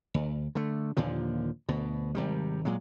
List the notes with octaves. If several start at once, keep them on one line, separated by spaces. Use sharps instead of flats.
D2
D3 A3
D#2 A#2 D3 F3
D2 B2
G#1 C3 G3
A#2 F#3 G#3